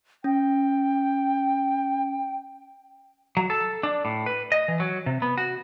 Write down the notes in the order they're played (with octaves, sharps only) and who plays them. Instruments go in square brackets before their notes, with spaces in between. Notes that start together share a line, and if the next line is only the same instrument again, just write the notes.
[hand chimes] C#4 [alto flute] G5
[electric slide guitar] F#3
A4
D4
A2
B4
D#5
E3
F#3
C3
B3
F#4